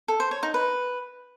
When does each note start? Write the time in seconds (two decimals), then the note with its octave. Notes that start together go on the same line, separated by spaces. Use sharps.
0.08 A4
0.20 C5
0.31 C#5
0.43 D#4
0.54 B4